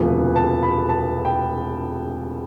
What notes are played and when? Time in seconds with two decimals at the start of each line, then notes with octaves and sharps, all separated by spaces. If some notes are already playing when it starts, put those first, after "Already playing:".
Already playing: E1 D2 C3 F3 B4
0.36 A5
0.63 B5
0.89 A5
1.25 G5